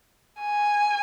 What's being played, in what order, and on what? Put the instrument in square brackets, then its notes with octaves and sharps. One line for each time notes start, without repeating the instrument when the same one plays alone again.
[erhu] G#5